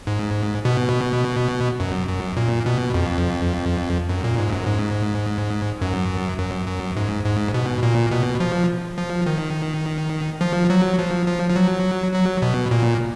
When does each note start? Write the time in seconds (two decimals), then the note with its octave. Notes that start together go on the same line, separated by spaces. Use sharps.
0.07 G#2
0.65 B2
1.80 F#2
2.08 F#2
2.37 A#2
2.66 B2
2.94 F2
4.09 F#2
4.24 A#2
4.38 G#2
4.52 F#2
4.67 G#2
5.82 F#2
6.39 F#2
6.68 F#2
6.97 G#2
7.25 G#2
7.54 B2
7.83 A#2
8.11 B2
8.40 F3
8.98 F3
9.26 D#3
10.41 F3
10.70 F#3
10.99 F3
11.27 F3
11.50 F3
11.56 F#3
12.14 F#3
12.42 B2
12.71 A#2